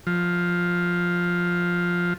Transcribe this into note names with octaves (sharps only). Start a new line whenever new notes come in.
F3